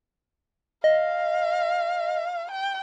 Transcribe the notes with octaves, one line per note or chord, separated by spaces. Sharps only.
D#5 F5
G5